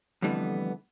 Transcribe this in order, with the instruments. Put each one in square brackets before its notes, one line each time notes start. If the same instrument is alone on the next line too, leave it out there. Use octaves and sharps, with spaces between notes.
[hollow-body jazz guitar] F2 D3 E3 G3 A3 B3